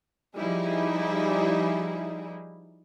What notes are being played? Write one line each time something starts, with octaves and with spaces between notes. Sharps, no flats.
F3 G3 D#4 E4 G#4